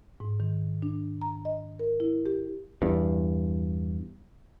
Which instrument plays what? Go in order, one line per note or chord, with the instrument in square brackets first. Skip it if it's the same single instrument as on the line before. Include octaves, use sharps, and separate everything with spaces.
[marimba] G#2
D#3
D4
A#5
D#5
A#4
E4
G4
[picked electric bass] E2 G2